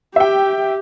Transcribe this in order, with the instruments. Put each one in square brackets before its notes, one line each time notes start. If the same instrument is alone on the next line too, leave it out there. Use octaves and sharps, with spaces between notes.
[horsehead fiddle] G4 [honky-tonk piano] E5 G5